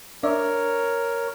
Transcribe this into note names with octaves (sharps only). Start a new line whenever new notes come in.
D4 A#4 C#5 D5 E5